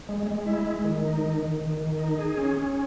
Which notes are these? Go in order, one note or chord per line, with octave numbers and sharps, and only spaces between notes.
G#3
G#3
E4
G#3
D#3
D#4
D#3
D#3
D#3
D#3
D#4
G#4
C#4
C#4